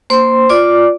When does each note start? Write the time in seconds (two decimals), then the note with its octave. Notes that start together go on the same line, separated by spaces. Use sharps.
0.10 A#3 C5 C6
0.50 F4 D5 D6